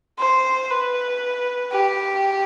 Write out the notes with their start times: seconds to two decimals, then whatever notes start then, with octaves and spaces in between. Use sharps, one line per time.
0.19 C5
0.70 B4
1.72 G4